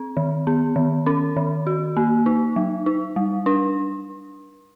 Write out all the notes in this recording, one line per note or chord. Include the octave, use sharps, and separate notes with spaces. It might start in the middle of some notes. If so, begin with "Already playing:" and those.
Already playing: C4
D#3
B3
D#3
C#4
D#3
F#4
A#3
D#4
F#3
D#4
G3
D4